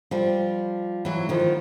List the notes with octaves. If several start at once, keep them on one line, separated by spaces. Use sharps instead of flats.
F3 G3
E3 F#3
D#3 F3